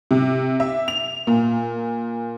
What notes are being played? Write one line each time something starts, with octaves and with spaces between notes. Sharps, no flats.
C3
E5
F7
A#2